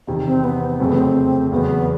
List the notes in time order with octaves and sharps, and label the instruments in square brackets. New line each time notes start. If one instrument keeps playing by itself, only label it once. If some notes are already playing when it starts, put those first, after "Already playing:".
[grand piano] E2 C3 D#3
[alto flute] C4
B3
[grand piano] F2 C#3 F#3 A3 [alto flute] C4
[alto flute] B3
C4
[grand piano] E2 C#3 F#3 [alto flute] B3